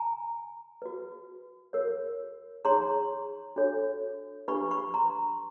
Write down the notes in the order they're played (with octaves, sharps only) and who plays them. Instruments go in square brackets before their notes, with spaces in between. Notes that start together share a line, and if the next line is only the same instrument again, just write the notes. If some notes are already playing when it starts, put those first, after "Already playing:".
Already playing: [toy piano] G#5 A#5
F#4 B4
F#4 A#4 C#5
D#4 G#4 C#5 A#5 C6
D4 F#4 A4 C#5
D4 G4 B4 B5 C#6
B5 C#6
A#5 C6